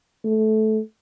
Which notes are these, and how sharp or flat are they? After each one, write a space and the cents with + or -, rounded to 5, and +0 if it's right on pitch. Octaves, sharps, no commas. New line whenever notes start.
A3 -15